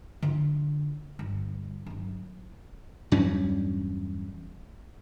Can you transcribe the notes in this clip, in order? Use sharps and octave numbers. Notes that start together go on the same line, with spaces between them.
D3 F4
G1
G1 F#2
E2 G2 F#3 C#4